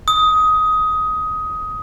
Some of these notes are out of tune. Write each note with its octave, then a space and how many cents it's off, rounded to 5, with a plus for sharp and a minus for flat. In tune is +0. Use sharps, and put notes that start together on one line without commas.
D#6 +15